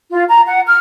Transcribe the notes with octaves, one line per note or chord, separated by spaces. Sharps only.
F4
A#5
F#5
F6